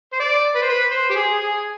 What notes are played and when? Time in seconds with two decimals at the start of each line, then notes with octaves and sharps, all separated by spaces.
0.13 C5
0.20 D5
0.56 B4
0.63 C5
0.69 B4
0.91 C5
1.10 G4
1.16 G#4
1.40 G#4